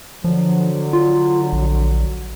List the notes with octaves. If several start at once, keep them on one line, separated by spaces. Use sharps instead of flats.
D3 F3 F#3
F4
A#1